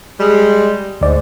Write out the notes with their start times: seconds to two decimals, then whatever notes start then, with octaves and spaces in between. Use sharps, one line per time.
0.19 G3 G#3
1.01 D2 G#2 D5